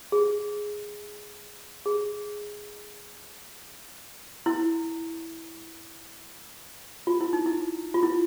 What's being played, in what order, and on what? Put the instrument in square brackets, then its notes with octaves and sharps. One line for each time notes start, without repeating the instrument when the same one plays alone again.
[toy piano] G#4
G#4
E4
F4
E4
D#4
E4
F4
E4